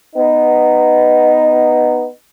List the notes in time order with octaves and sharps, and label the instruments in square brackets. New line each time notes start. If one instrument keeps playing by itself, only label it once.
[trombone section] B3 D#4